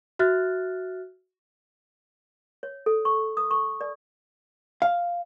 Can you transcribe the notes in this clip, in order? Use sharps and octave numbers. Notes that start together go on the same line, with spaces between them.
F#4 E5 F6 F#6 A6
C#5
A4
C#6
D#6
C#6
D5
F5